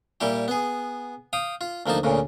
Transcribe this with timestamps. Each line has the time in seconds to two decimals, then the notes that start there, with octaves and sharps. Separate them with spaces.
0.21 A#2 G3 E4 G4
0.48 B3 G#4
1.33 F5 G5 D#6
1.61 F4
1.86 D2 F3 A#3 D#4 A5
2.03 D2 A#2 C#3